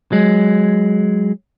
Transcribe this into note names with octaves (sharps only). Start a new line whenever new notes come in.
F#3 G#3